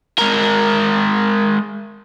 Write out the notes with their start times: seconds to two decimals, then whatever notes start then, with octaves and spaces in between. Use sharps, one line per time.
0.18 G#3 A#4